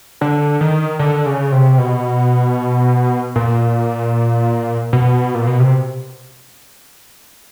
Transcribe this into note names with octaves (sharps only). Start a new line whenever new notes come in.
D3
D#3
D3
C#3
C3
B2
A#2
B2
A#2
B2
C3